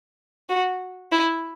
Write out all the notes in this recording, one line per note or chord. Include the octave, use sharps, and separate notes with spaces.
F#4
E4